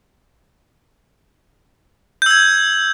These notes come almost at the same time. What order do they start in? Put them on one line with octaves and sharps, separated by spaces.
G6 E6 G#6